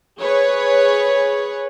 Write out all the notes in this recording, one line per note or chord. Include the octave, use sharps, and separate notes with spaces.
G#4 B4 C#5